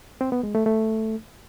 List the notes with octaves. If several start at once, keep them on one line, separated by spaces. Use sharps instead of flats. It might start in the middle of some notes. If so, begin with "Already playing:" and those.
C4
B3
G#3
A3
A3